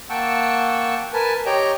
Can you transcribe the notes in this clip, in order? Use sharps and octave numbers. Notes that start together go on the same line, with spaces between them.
A#3 F#5 G5 A5 C#6 E6
A#4 B4 G#5 A5
G4 C#5 D#5 G5 A#5